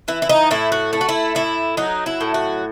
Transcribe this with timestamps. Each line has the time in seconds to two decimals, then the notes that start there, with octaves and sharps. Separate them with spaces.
0.08 E3 E4
0.22 E4
0.29 D#4
0.51 A2 E4
0.72 F#4
0.93 A3 E4
1.01 F#4
1.09 E4
1.35 A2 E4
1.77 F#3 D#4
2.06 E4
2.21 A2
2.34 F#4